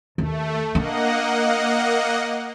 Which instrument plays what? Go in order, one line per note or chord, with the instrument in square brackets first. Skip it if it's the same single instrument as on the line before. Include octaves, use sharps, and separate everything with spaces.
[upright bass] D#2 [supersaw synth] A3
[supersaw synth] A#3 D#5 F#5 [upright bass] D4